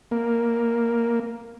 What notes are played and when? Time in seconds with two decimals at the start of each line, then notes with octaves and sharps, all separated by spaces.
0.11 A#3